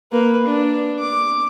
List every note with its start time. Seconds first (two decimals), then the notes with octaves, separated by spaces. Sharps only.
0.12 A#3 B4
0.47 D4
0.99 D6